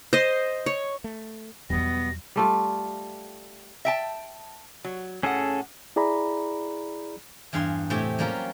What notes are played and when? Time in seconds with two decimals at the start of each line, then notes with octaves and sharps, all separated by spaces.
0.13 C5 D#5
0.66 C#5
1.04 A3
1.70 E2 B2 F#3 G3 B3 A#6
2.36 G3 A3 F4
3.85 E5 G5 A5
4.84 F#3
5.23 A2 C#4 G#4 A4 F#5
5.96 E4 G#4 D5 A#5 B5
7.53 E2 G2 F5 G#5 C6
7.90 A2 C3 G4 E5 G#5
8.19 F#3 G3 A#3 C#4 F4 A#4